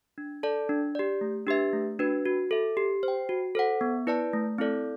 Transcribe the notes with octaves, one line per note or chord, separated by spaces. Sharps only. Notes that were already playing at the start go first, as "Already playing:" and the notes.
D4
A4 D5 A5
D4
G4 D5
A3
D4 G4 B4 E5
A3
D4 F#4 B4
F#4
A4 E5
G4
C5
G5
F#4
A4 C5 F#5
B3
E4 B4 D5 A5
A3
C4 E4 A4 D5